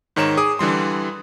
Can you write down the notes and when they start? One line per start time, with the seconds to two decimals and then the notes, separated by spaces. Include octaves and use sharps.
0.16 G#2 D#3 C#5 A#5 E7
0.37 G#4 D6 D#6
0.59 D3 E3 G3 C6